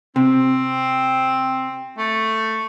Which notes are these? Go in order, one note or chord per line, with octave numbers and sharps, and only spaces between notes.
C3 C4
A3